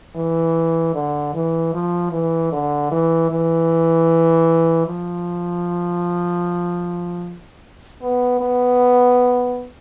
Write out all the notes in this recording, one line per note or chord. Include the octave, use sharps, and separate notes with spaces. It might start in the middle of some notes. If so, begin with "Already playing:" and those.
E3
D3
E3
F3
E3
D3
E3
E3
F3
B3
B3